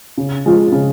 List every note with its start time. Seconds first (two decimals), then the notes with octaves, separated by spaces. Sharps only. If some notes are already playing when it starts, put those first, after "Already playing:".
0.18 C#3
0.45 F3 G#3 F4
0.72 C#3